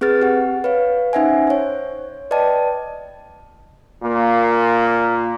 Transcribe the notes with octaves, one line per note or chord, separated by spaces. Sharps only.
C4 G#4 B4 F6 A6
G4 F#5
B4 C#5 F5
C#4 D#4 C5 E5 F#5 G#5
C5 C#5
B4 D5 D#5 G5 A5
A#2 A#3